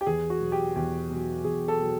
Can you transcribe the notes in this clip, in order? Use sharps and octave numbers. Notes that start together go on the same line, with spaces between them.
G4
E2 G#4
F#4
B2 F#3
G4
E2 G4
B2 F#3
E2 G#4
A4
B2 F#3